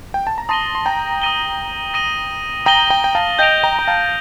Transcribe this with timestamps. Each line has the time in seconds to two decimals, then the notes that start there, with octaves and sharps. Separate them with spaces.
0.14 G5
0.27 A5
0.38 A#5
0.49 A5 C6 D#6 A#6 D#7 G7
0.75 C6
0.86 G5 A#5
1.22 D#6 A#6 D#7 G7
1.94 D#6 A#6 D#7 G7
2.66 G5 A#5 D#6 A#6 D#7 G7
2.90 G5 A#5
3.04 G5
3.15 F5 A5
3.39 D#5 G5 G6 A#6 D7 F7
3.63 G5 A#5
3.79 A#5
3.88 F5 A5